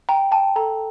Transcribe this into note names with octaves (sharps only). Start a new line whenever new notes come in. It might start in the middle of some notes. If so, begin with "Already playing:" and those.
G5 A#5
G5 A5
A4 A#5